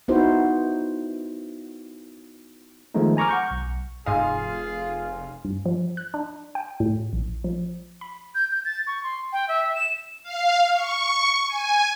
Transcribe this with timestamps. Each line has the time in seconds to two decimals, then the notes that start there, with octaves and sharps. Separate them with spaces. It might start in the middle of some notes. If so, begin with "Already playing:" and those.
0.08 B3 D#4 E4 F#4 C5
2.94 D#3 F3 G#3 A3 B3 D#4
3.17 G#5 A#5 C#6 D6 F6
3.29 F#5 C#6 G6
3.51 B1
4.06 F1 G#2 F4 G#4 D#5 F5 G#5 C6
5.45 G2
5.66 F3
5.97 F#6
6.14 D4
6.55 G5
6.80 A2
7.13 A#1
7.44 F3
8.01 B5
8.35 G6
8.51 G6
8.65 A6
8.87 C#6
9.03 C6
9.33 G5
9.49 E5
9.74 E7
10.23 F5
10.74 C#6
11.47 G#5